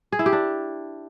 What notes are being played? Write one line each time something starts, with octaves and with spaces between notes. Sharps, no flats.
G#4
E4
G4
D4